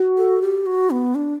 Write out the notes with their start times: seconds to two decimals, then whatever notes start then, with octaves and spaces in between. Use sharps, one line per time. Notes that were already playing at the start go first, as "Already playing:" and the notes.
Already playing: F#4
0.18 A4
0.42 G4
0.66 F#4
0.91 B3
1.15 D4